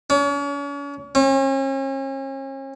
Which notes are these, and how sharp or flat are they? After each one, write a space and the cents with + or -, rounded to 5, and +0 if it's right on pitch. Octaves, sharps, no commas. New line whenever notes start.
C#4 +40
C#4 -40